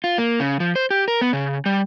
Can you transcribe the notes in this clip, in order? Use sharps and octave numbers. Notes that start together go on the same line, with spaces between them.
F4
A#3
C#3
F3
C5
G4
A#4
B3
C#3
G3